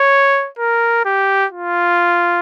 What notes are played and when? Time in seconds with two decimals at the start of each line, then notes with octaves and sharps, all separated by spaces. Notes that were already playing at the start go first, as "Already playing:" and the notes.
Already playing: C#5
0.59 A#4
1.05 G4
1.52 F4